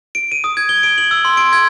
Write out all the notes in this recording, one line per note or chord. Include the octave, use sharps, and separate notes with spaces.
D7
D#7
D#6
G#6
G7
D7
F#7
E6
C6
D7
G#6